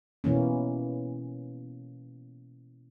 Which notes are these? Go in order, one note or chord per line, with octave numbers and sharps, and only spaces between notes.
B2 E3 A#3 C#4